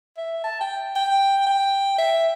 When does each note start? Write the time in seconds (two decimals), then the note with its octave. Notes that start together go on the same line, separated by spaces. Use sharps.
0.17 E5
0.44 A5
0.61 G5
0.96 G5
1.47 G5
1.98 E5